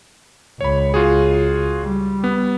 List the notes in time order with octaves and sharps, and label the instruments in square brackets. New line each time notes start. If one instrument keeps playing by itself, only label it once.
[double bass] C#2 [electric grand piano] C#5 B5
[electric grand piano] F4 F#4 G#4
[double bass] G3
[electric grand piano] B3